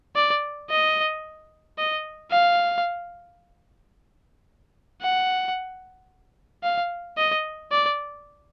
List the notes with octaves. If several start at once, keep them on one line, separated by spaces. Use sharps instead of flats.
D5
D#5
D#5
F5
F#5
F5
D#5
D5